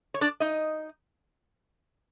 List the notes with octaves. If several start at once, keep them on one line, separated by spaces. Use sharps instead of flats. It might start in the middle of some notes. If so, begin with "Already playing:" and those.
C#5
D4 D5
D#4 D#5